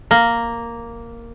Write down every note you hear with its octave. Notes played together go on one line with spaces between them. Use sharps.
A#3